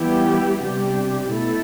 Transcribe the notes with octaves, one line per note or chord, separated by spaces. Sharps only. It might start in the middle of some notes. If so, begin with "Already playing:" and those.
Already playing: E3 G3 B3 E4 G4
C3 G3 D4 G4
B2 A3 E4 A4